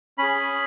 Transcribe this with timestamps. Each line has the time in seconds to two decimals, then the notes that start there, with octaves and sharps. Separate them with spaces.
0.18 C#4 G#4 B5